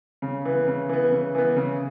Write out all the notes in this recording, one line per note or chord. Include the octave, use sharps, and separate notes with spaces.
C#3
E3 B3
C#3
E3 B3
C#3
E3 B3
C#3